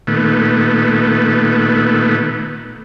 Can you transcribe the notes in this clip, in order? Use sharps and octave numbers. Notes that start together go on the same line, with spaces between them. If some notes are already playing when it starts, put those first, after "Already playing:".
A#2 D#3 A3 B3